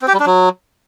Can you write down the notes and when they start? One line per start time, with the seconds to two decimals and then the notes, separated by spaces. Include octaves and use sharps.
0.02 C4
0.08 G4
0.14 G3
0.20 D4
0.26 F#3